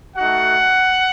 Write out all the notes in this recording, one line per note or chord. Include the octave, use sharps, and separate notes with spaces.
A3 D#4 F#4 F#5